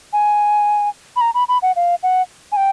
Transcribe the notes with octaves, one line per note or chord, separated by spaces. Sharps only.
G#5
B5
A#5
B5
B5
F#5
F5
F#5
G#5
G5